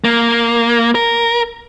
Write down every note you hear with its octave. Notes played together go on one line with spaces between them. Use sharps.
A#3
A#4